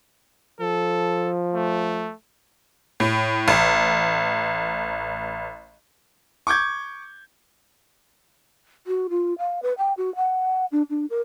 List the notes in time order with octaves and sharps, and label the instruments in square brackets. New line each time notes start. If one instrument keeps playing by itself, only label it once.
[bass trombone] F3 [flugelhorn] A4
[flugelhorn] A3
[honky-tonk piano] A2
A1
[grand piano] C#6 D6 G6 G#6
[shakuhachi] F#4
F4
F5
B4
G5
F#4
F#5
D4
D4
A#4